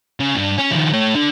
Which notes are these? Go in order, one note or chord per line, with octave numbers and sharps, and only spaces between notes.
C#3
G2
C#4
D#3 F3
A3 C#5
D3